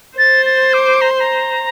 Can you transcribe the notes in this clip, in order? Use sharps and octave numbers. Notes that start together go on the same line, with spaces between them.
C5 A6
A6
D6
A#5
C6
A#5